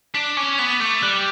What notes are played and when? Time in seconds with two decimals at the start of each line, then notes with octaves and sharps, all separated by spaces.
0.15 D4 B6
0.37 C#4 D6
0.58 B3 B6
0.80 A3 D6
1.02 G3 F#6